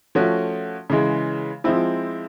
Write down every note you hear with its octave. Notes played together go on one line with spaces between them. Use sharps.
F3 A3 C#4 F#4
C#3 E3 G#3
F3 G#3 C4 E4